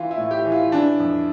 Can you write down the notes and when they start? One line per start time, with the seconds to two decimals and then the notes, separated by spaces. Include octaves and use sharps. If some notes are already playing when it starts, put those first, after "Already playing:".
Already playing: E3 F4
0.11 E4
0.17 A2
0.31 G4
0.45 E3
0.52 F4
0.72 E3 D4
1.00 F2